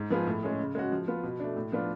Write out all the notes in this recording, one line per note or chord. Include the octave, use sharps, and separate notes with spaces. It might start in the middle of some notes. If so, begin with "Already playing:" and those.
Already playing: G#2
F3 B3 F4 G#4
A2
G#3 C#4 G#4
C#3
G#3 C#4 F#4
F3
B3 F4
B2
A3 D4
A2
F3 B3 D4 F4